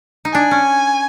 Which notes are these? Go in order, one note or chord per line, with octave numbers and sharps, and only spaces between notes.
D#4
D4 G#5
C#4